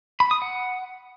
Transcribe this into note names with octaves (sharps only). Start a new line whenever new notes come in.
B5
D#6
F#5